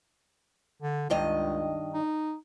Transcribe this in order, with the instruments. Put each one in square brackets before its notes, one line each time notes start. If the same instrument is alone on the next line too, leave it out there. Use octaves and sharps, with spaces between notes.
[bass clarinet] D3
[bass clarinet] C#2 [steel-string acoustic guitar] G2 D#3 D#5
[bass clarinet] D#4